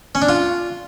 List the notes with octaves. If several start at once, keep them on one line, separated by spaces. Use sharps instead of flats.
C#4
D4
F4